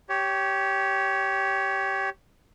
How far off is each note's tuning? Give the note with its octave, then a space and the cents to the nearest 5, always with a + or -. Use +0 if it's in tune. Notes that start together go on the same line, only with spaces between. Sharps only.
G4 -10 C#5 +10